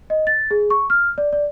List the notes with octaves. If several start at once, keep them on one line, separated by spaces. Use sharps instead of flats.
D#5
A6
G#4
C#6
F6
D5
D5